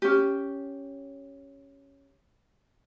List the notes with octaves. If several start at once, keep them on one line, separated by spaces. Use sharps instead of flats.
C#4 G4